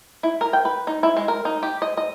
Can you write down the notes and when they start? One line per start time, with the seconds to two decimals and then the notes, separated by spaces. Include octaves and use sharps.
0.23 E4
0.41 A#4
0.53 G5
0.65 B4
0.87 D#4
1.03 E4
1.17 G#3
1.28 A#4
1.45 D#4
1.63 G4
1.82 D#5
1.97 D#5